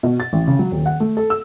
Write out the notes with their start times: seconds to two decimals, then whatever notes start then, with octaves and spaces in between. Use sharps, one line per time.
0.03 B2
0.20 A6
0.33 A1
0.48 C#3
0.59 F#3
0.71 D#1
0.86 F#5
1.00 A3
1.17 A4
1.30 E6